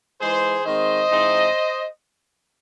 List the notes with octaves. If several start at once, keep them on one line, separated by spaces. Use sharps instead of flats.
E3 G#3 D#4 G#4 C5
D#3 G#3 C4 C5 D#5
G#2 E3 C4 D#4